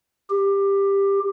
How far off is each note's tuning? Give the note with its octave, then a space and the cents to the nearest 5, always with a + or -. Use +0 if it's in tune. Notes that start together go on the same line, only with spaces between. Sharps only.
G4 +15